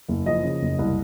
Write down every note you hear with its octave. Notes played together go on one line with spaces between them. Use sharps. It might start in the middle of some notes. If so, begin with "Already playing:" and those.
F#1
F3 D#5
C#3
F#1
C2